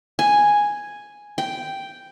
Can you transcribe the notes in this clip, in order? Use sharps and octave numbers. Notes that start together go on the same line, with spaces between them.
G#5
G5